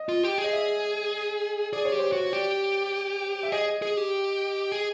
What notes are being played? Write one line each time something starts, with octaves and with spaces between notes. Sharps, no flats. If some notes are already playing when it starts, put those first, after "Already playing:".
Already playing: D#5
F4
G4
G#4
D#5
E5
G#4 D5
C#5
G4
C5
F#4 C#5
G4 D5
E5
G#4 D#5
G#4
G4
G#4